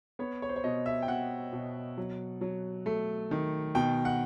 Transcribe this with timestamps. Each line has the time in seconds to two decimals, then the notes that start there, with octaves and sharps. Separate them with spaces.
0.19 B3 C#5
0.42 C#5
0.49 C5
0.56 C#5
0.64 B2 D#5
0.86 E5
1.02 G5
1.08 B2 F#5
1.53 B2
1.98 F#3
2.41 F#3
2.86 A3
3.31 D#3
3.75 B2 G5
4.05 F#5